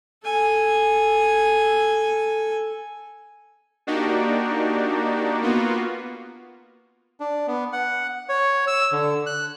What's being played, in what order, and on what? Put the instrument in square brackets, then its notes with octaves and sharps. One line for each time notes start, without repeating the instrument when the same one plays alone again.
[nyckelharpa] A4 G#5
[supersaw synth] A#3 D4 D#4 F#4 G4
A#3 B3 F4 F#4
[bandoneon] D4
B3
F#5
C#5
E6
D3
F#6